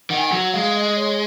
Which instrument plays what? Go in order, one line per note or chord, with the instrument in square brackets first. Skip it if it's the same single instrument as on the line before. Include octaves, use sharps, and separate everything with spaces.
[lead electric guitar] D#3 [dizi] F#5
[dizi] G#5
[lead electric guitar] F#3 [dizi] F#5
[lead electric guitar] G#3 [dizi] F5
[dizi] D#5
C#5